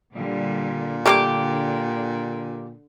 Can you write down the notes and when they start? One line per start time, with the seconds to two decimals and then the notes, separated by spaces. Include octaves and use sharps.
0.14 A#2 D3 G3
1.06 D3 G3 A3 A#3 G4 D6